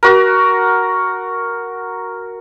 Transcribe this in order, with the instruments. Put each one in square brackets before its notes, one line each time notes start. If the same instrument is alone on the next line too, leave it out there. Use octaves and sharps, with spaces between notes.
[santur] F#4 A#4